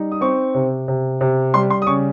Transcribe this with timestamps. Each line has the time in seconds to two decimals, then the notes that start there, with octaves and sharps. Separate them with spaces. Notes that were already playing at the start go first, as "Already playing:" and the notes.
Already playing: G3 D#4
0.12 D#6
0.21 C4 C#6
0.54 C3
0.88 C3
1.21 C3
1.54 G3 C6
1.70 C6
1.82 D#6
1.87 C#3 C#6